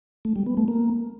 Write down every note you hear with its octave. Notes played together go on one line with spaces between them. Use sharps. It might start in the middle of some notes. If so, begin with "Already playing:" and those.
A3
G3
B3
A3
A#3